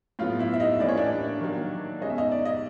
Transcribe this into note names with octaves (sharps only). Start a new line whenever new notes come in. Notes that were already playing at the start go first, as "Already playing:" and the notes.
A2 F#3 B3 F4 F5
E4 E5
E5
D#4 D#5
A2 E3 G3 A#3 C#4 D5
C#5
D4 D5
D#3 F#3 A#3
B2 G#3 C#4 D#5
E5
D#4 D#5
D5
D#5